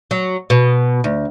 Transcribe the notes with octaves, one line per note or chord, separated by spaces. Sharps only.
F#3
B2
D2